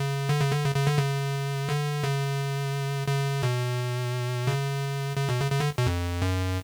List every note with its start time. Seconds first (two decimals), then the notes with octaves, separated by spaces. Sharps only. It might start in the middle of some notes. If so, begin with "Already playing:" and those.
Already playing: C#3
0.29 D3
0.40 C#3
0.52 D3
0.64 C#3
0.76 C#3
0.87 D3
0.98 C#3
1.69 D3
2.04 C#3
3.08 C#3
3.43 B2
4.47 C#3
5.17 C#3
5.29 B2
5.41 C#3
5.52 C#3
5.60 D3
5.78 B2
5.86 F2
6.22 F#2